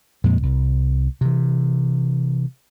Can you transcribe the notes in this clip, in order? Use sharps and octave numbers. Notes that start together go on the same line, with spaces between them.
F2 A#2 G#3
C2
C3 E3